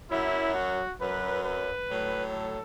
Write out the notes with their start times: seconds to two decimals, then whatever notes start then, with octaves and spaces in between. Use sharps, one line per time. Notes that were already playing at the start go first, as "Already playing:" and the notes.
0.10 F#2 F#3 E4
0.55 F#4
0.99 F#2 F#3 B4
1.44 B4
1.88 A2 F#3
2.32 A4